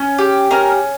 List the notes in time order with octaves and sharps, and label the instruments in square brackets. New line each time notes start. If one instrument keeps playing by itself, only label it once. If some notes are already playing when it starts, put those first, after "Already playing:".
Already playing: [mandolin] C#4
G4
C#4 A#4